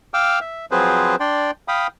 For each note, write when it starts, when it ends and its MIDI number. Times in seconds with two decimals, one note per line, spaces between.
0.14 0.39 77
0.14 0.39 79
0.14 0.39 86
0.14 0.39 88
0.14 0.39 89
0.41 0.66 76
0.71 1.16 53
0.71 1.16 54
0.71 1.16 60
0.71 1.16 68
0.71 1.16 71
0.71 1.16 72
1.20 1.51 62
1.20 1.51 74
1.20 1.51 79
1.20 1.51 84
1.68 1.87 77
1.68 1.87 79
1.68 1.87 83
1.68 1.87 87